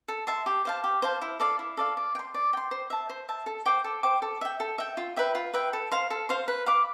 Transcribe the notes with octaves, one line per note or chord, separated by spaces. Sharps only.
A4
E5 A5 C6
G4
C5 F5 A5
G4
C5 F5 A5
E4
A4 D5 F5
E4
A4 D5 F5
D5
G5
C6
D5
G5 C6
C5
E5 A5
C5
E5 A5
A4
C5 G5 D6
A4
C5 G5 D6
A4
E5 G5
A4
E5 G5
F4
B4 E5 G5
F4
B4 E5 G5
A4
C5 F5 C6
A4
C5 F5 C6
B4
F5 B5 D6